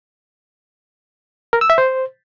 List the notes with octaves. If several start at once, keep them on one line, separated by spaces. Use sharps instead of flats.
A#4
E6
E5
C5